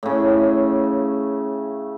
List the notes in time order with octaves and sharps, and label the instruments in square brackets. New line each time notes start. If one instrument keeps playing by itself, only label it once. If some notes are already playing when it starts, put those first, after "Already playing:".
[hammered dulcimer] A2 C#3